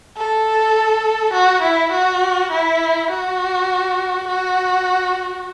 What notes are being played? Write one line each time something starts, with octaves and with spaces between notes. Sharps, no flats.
A4
F#4
E4
F#4
E4
F#4
F#4